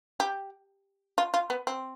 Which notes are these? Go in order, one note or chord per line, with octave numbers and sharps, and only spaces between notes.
G4
F4
F4
B3
C4